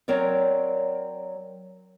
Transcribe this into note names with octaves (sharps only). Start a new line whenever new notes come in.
F#3 C4 A#4 C#5 D5